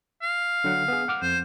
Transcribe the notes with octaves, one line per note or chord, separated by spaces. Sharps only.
F5
D3 F#3 F#5
B3 G#4
F#5 D6 F6
F2 C5